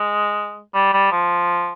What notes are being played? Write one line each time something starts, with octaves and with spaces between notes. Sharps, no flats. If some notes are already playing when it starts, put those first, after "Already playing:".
Already playing: G#3
G3
G3
F3